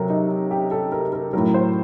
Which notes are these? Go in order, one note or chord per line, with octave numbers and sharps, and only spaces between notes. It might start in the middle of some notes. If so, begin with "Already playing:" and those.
Already playing: C3 F#3 A4 A#4
D#4
G4
A4
A#4
A#4
A2 F#3 A#4
C5